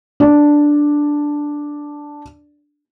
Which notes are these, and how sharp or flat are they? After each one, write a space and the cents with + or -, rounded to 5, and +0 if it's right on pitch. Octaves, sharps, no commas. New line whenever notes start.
D4 +0 D5 +0